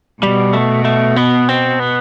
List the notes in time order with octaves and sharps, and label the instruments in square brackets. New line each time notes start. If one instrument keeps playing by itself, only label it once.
[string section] B2 [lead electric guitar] G3
[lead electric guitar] A3
A3
B3
C4
B3